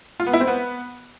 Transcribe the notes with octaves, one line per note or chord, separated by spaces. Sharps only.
F4
B3
E4
C4
B3